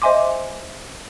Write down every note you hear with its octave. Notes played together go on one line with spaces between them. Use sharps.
C5 D#5 E5 G#5 C6 D6